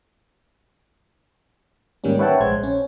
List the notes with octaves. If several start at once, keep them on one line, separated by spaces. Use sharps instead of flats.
G#2 D#3 G3 A#3 C#4
B4 C#5 E5 F#5 G5 A5
A#1 G#3 C5 G#6
C#4